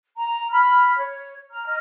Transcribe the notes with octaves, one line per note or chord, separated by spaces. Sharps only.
A#5
B5 F6
C#5
A#5 F6
D#5 F6